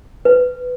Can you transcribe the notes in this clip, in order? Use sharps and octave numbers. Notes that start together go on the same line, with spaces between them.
B4